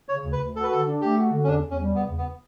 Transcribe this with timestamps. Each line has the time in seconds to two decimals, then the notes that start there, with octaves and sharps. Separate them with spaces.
0.09 C#3 C#5
0.25 D2
0.32 B4
0.40 D2
0.56 F#4 A4
0.63 B4
0.71 D3 A4
0.86 D4
1.01 A3 G4
1.17 F#4
1.32 D3
1.44 C#4
1.48 E2 D4
1.63 E2
1.71 C#4
1.78 G3
1.94 C#3 B3
2.10 E2
2.18 B3